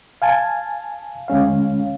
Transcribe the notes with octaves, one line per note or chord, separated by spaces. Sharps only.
F5 G#5 A5
D2 G#3 C#4 F5